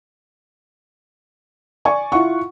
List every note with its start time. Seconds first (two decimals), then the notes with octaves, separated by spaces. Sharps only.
1.85 D5 G#5 C#6
2.12 E4 F4 F#5 C#6